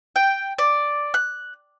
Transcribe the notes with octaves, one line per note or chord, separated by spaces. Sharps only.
G5
D5
F#6